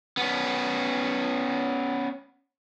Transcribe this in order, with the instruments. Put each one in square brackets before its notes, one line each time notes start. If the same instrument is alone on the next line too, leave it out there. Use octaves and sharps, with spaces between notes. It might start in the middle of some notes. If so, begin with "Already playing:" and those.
[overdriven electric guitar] B3 C#4